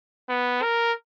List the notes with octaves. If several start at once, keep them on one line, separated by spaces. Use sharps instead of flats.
B3
A#4